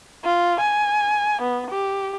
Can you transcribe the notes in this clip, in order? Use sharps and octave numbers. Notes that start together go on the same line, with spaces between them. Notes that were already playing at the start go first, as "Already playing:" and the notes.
F4
G#5
B3
G4